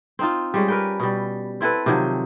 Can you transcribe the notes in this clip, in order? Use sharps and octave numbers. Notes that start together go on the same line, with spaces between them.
C4 D#4 F4
G3 G#3 C#4
A#4 B4 G5
B2 G3
C4 E4 A4 B4
C3 D#3 F3 F#3